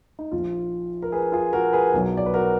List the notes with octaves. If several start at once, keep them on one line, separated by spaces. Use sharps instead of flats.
D#4
A#1 A#2 F3 F4
A#4
G#4 B4
F4 G#4
F#4 A#4
G#4 B4
B1 B2 F#3
D5
B4
F#4 A#4